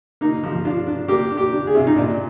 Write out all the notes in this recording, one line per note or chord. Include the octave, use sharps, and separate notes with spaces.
A#3 D#4
F3
D4 F4
D4
A#3 G4
D4
G4
D4
G#4
C3 F4
D#4
A#2 D4